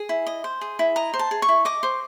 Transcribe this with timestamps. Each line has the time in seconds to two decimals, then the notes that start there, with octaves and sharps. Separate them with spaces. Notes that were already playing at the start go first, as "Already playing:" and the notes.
Already playing: G#4 G#5
0.09 E4
0.27 D#5
0.44 C5
0.61 G#4
0.79 E4
0.96 D#5 A#5
1.14 C5
1.19 A5
1.31 G#4
1.42 C#6
1.49 E4
1.65 D#5 D6
1.83 C5